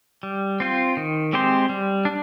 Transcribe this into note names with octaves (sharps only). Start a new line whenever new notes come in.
G3
C4 F4 C5
D#3
G#3 C4 G4 C5
G3
D4